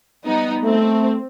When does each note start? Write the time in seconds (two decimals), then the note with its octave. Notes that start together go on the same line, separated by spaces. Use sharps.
0.25 G3 B3 D#4
0.64 A3 C4